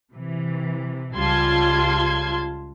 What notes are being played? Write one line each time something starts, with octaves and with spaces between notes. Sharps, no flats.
C3 E3
C#2 G3 F4 A5 C6 G#6